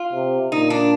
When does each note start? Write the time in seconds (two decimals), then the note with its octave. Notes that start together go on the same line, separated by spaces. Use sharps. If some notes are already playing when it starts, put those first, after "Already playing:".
Already playing: F4
0.13 C3
0.52 A#2 D#4
0.70 D4